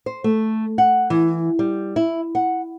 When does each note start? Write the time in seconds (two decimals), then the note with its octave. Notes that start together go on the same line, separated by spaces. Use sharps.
0.06 C5
0.24 A3
0.78 F#5
1.10 E3
1.59 G3
1.96 E4
2.35 F#5